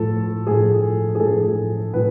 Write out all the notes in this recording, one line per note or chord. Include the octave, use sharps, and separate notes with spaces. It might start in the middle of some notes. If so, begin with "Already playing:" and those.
Already playing: A2 F3 A3 A4
A2 F3 A3 G#4
G#4
A2 F3 A3 A4
A2 F3 B4